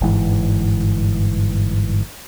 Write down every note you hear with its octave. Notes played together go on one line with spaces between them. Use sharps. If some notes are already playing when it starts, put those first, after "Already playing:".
G1 G#2 E3